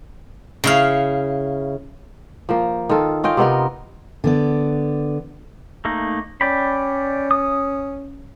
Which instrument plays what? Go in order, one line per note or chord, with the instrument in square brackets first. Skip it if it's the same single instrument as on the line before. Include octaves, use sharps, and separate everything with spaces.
[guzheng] C#3 E4 F5
[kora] F3 A#3
D#3 F4 A4
C#4 F4 D#5 G5
C3 B3 D#4 A#4
[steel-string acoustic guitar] D3 B3 D5
[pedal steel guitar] A3 A#3 D#4
[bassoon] C#4 [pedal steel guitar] D5 G5 B5
[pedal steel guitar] D#6